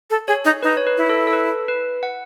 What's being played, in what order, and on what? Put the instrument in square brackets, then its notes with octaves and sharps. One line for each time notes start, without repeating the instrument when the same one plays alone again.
[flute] A4
[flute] G#4 [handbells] C#5
[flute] D#4
[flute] D#4 [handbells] B4
[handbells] C#5
B4
[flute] E4
[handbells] A4
A4
B4
B4
F#5